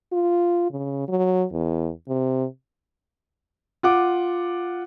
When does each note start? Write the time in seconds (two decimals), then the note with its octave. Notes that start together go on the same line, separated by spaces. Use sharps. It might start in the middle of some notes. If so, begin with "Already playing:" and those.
0.13 F4
0.71 C#3
1.08 F#3
1.52 E2
2.09 C3
3.83 F4 F#5 D6